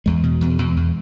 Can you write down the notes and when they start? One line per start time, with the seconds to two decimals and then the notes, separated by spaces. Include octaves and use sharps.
0.06 E2 G#3
0.23 B2
0.41 E2
0.58 E2
0.77 E2